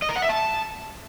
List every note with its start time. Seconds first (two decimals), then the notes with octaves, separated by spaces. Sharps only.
0.02 D#5
0.09 A#4
0.16 F#5
0.22 E5
0.29 A5